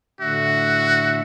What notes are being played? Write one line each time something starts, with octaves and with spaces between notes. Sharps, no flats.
A2 D3 F#4 E5